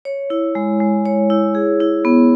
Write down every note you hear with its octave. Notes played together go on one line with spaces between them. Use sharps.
C#5
E4
G#3
G#3
C#5
E4
G#4
E4
B3